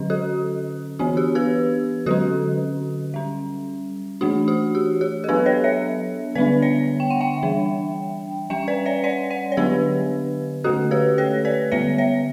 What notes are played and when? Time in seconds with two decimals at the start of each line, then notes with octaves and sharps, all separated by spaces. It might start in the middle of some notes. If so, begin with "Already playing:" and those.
Already playing: D3 F#3 C#4
0.10 F#4 A4
0.99 E3 B3 D4 F#4
1.17 G4
1.35 G4 B4
2.06 D3 F#3 C#4 F#4 A4
3.14 G3 C#4
4.21 E3 A3 D4 F#4
4.48 F#4
4.75 G4
5.01 G4
5.24 A4
5.28 F#3 B3 D4 G4 B4
5.46 A4 C#5
5.64 C#5 E5
6.35 D3 G3 B3 D4 B4 D5
6.62 C#5 E5
7.00 G5
7.10 F#5
7.20 E5 G5
7.43 E3 G3 D4
8.50 G3 C#4 E5 G5
8.68 B4 D5
8.86 C#5 E5
9.04 D5 F#5
9.30 D5 F#5
9.52 C#5
9.57 D3 F#3 B3 D4 G4 B4
10.64 D3 A3 C#4 F#4 A4
10.91 G4 B4
11.18 A4 C#5
11.45 B4 D5
11.72 D3 G3 B3 C#5 E5
11.98 C#5 E5